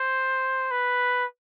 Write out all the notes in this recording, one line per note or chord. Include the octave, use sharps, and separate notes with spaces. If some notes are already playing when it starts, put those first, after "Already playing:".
Already playing: C5
B4